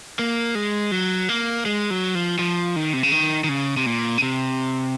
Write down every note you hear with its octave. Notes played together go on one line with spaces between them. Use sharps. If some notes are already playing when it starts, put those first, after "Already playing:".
A#3
G#3
F#3
A#3
G#3
F#3
F3
F3
D#3
C3
C#3
D#3
D#3
C#3
C3
A#2
C#3
C3